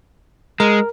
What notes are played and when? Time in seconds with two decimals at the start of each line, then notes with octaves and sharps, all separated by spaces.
0.60 G#3 A#4